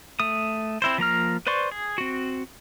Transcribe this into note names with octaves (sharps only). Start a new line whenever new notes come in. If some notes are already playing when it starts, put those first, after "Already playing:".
A3 D#6
C4 E4 C5
F3 A#3 A#5 F6
B4 C5 D5 C6 C#6
G#4
C4 F#4